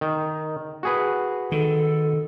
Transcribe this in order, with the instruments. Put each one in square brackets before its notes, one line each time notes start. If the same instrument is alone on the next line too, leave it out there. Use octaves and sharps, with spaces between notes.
[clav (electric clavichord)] D#3
F#4 G#4 B4
[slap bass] D#3 [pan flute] A4